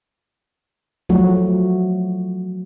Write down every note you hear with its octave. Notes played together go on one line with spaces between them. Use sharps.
F3 F#3 A3 F#4